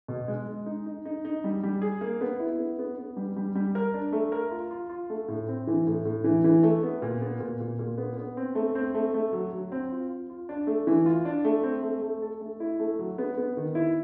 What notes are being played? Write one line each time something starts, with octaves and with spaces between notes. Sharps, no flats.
B2
G#3
G#3
D#4
D#4
D#4
D#4
G3
G3
G#4
A#3
B3
E4
B3
B3
B3
G3
G3
G3
A#4
D4
A3
A#4
F4
F4
F4
A3
A2
C4
E3
A2
A2
E3
E3
A3
B3
A#2
B3
A#2
A#2
A#2
B3
B3
C4
A3
C4
A3
A3
F#3
F#3
C4
F4
F4
F4
D4
A3
E3
F4
D4
A3
C4
A3
A3
A4
A3
E4
A3
F#3
B3
B3
D#3
E4